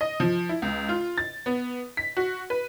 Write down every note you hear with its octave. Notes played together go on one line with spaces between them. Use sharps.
D#5
F3
E4
C#2
F4
A6
B3
B6
F#4
B4